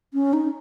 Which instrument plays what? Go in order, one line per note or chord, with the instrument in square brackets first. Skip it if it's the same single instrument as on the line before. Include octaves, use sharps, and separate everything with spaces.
[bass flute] C#4
D#4